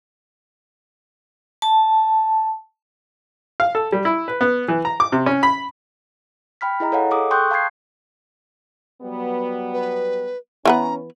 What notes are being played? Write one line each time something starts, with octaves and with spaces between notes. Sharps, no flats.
A5
F5
A4
G3
E4
B4
B3
E3
A#5
D6
C3
C#4
B5
G5 B5 F6 B6
E4 G#4 D#5 A#5
A4 C#5 D#5 F5 F#5 G#5
G#4 A4 D6 D#6
G5 C6 C#6 D#6 F#6 G6
F5 A5 C#6 G6 G#6 C7
F#3 G3 B3
B4
E3 B3 C#4 B4 A#5